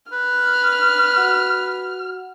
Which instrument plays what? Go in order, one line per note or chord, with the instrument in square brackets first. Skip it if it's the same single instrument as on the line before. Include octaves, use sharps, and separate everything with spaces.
[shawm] B4 [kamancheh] F6
[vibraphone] F#4 F#5